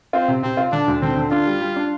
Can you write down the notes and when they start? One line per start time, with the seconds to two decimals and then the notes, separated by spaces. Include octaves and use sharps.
0.13 C4 F4
0.28 C3
0.42 C3 C4
0.57 F4
0.72 D3 D4
0.88 D2
1.01 D3 C4
1.17 D3
1.31 D4 F4
1.46 G3
1.61 G3
1.76 D4